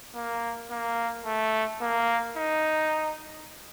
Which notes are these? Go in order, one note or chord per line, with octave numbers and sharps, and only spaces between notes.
A#3
A#3
A3
A#3
D#4